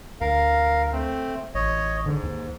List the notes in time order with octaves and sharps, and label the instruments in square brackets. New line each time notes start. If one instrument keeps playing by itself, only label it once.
[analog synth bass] D2 [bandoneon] A#4 F5
[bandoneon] A3 C4
[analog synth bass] A1 [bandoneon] C#5 D#5
[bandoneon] G#2 [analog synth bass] D3
[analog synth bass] D#2